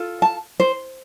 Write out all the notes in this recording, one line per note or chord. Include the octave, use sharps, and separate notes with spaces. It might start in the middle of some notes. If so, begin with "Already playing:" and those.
Already playing: F4 A4
A5
C5